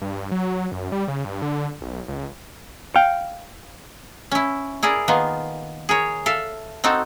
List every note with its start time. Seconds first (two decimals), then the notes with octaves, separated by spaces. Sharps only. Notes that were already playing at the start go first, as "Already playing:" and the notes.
0.02 G2
0.32 F#3
0.72 F#2
0.92 G3
1.08 C#3
1.25 G2
1.42 D3
1.81 B1
2.08 C#2
2.96 F5 G5
4.31 C#4 E4
4.83 E4 G#4 A#4 D5
5.08 D#3 A#3 B3 F4
5.89 G#4 A#4 C#5
6.26 A4 E5 F5
6.84 C4 D#4 F#4 A4